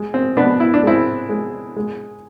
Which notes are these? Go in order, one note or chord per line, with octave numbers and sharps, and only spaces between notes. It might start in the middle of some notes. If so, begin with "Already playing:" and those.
Already playing: G#3
C4
B2 B3 D4
E4
D4
G#3 C4 E4
G#3
G#3